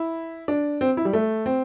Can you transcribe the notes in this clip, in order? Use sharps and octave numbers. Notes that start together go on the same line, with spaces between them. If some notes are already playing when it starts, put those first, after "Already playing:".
Already playing: E4
D4
C4
E4
G3
A3
C4